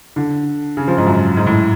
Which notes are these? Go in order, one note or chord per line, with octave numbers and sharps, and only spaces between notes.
D3
C#3
F3
G#2
F#2
G#2
A2